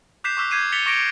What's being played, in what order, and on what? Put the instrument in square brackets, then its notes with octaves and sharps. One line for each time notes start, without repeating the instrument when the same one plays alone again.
[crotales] D6 F#6 G6 B6 C7 E7
C#6 D6 E6 F#6 B6
D6 G6 G#6 C7 D#7 E7
A6 B6 C#7 F7 G7
C#6 D6 A#6 C#7 D7